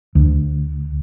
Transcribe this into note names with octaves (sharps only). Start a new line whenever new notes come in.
D2